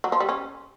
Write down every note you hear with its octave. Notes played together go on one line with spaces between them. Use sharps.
F#3
F3
G3
C#4